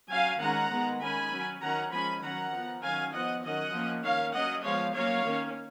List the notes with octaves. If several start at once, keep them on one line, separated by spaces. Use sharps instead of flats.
F#3 C#4 F5 G#5
D#3 G#3 C#4 F#5 A#5
D#3 G#3 B3
D#3 G#3 C#4 G#5 B5
F#3 C#4
D#3 F#3 C#4 F#5 A#5
F3 G#3 C#4 G#5 B5
D#3 F#3 C#4 F#5 A#5
F3 B3
D#3 F#3 C#4 F5 G#5
F3 B3 D#5 F#5
D#3 F#3 C#4 D#5 F#5
F3 A#3 C#4
D#3 A#3 C#4 C#5 F5
F#3 C#4 D#5 F#5
F3 G#3 B3 C#5 F5
F#3 A#3 C#4 C#5 F5
D#3 A#3 C#4